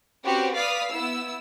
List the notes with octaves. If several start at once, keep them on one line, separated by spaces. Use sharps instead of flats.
C4 C#4 F#4 G4 B4
B4 D5 F5 D#6 F6 B6
B3 E4 E6